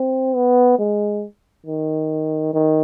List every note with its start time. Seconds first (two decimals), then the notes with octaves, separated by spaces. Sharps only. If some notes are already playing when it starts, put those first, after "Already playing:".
Already playing: C4
0.36 B3
0.79 G#3
1.66 D#3
2.54 D#3